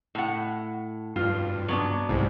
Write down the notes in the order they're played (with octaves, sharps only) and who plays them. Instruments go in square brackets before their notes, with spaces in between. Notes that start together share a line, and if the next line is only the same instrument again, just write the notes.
[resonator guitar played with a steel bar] A2 F#5
[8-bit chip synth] G2 [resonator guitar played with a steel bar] F4
[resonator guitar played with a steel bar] F#3 B3 D4
[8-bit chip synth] C2 G#2